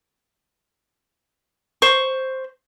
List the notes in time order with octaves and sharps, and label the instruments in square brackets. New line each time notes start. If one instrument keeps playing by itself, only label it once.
[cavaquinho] C5 C#6